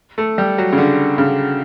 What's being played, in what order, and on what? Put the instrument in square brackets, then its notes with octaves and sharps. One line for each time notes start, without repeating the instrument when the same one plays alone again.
[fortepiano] A3
G3
F#3
C#3
D3
C#3